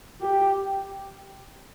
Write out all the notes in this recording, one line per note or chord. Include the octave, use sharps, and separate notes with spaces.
G4